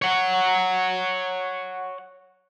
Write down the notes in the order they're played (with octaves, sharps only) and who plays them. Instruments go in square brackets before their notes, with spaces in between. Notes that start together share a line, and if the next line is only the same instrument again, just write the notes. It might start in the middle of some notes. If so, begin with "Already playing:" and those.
[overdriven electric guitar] C#5 F#5